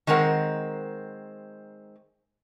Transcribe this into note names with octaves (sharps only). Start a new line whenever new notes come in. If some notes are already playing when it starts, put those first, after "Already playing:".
D#3 G#3 C4 A#4 F#5